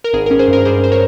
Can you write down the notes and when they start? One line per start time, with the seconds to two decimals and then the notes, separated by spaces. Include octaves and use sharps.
0.04 A#4
0.13 G#1 G#4
0.26 A#4
0.31 C#4
0.39 G#4 C5
0.48 G2
0.53 A#4
0.65 G3 G#4 C5
0.84 C5
0.92 A#4 C#5